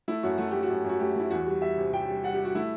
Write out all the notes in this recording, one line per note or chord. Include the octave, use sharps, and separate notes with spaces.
A3 E4
F#2 F#4
A3 F#4
A3 G4
F#4
F#2
F#2 F#4
A3 G4
A3 E4
E2 F#4
G3
G3 E5
C3
C3 G5
G3
G3 F#5
G3 G4
F#4
A3 E4